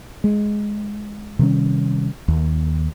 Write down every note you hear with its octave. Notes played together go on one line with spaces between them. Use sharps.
G#3
C3 D#3 G3 C#4
D#2